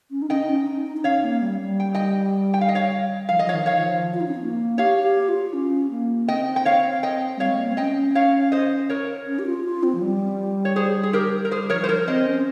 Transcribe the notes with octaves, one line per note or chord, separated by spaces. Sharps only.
C#4
D#4
C#4 D#5 G5
D#4
C#4
D#4
D#4
D#4
C#4 C#5 F5
A#3
G3
G3
G5
D#5 G5
G5
F5
D#5
C#5 F5
F3 F5
D#5
F3
C#5 F5
D#3
C#5 F5
F3
F4
D#4
C#4
C4
A#3
G4 C#5 F5
G4
F4
C#4
A#3
C4 D#5 G5
G5
C#5 F5
D#5 G5
G3 C#5 F5
G#3
A#3
C4
C#4 D#5 G5
C#5 F5
C5 D#5
A#4 C#5
C#4
G4
F4
F4
C4
F3
G3
C#5
G#4 C5
G#4
G4 A#4
A#4
G3 G#4 C5
F3 A#4 C#5
C5
A#4 C#5
C4 C5 D#5
C#4